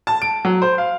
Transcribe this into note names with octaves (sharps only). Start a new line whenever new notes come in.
A5
D7
F#3
C5
F5